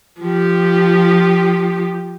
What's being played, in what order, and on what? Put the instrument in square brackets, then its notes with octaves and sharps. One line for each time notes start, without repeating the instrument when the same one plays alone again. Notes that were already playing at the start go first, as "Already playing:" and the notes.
[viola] F3 G4